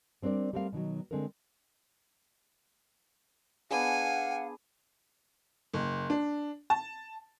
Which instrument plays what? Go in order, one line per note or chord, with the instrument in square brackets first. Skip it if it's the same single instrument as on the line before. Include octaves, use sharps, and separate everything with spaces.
[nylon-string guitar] G3 C4 D4 A#4 D5
G3 A3 C4 A#4 F5
B2 D#3 F#3
D3 G#3 C4 D4 A4 A#4
[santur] B3 D4 G#4 [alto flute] F5 [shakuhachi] F#5 [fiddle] G#5
[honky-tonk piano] F#1
D4
A5